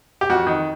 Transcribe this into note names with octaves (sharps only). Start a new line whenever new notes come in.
G4
F2 F#4
D#3